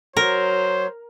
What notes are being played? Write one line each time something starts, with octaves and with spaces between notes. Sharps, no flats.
F#3 A#4 C5